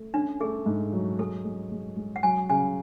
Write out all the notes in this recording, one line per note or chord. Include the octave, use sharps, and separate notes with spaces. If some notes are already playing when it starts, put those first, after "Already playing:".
Already playing: A3
C#4 D4
A3 G#4
G#2
F#3
G#3 A4
G#3
G#3
G#3
F#5
F#3 G#5
C#3 G#5